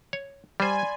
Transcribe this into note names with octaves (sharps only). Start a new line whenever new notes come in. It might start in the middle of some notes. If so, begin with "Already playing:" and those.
C#5
G3 C5 D5 G#5 B5 C6